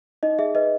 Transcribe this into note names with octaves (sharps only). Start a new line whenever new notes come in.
D#4 D#5
G#4 E5
B4 D#5